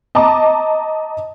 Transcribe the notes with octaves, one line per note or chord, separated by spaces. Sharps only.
D#5 A5 A#5 D6